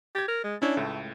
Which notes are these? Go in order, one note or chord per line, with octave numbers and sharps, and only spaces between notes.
G4 G#6 A6
A#4
G#3
C#4 D4 E4 C#5
C#2 A2 A3